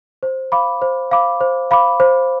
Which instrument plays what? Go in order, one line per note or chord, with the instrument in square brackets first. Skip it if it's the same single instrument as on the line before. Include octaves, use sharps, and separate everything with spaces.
[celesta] C5
F5 B5 D6
C5
F5 B5 D6
C5
F5 B5 D6
C5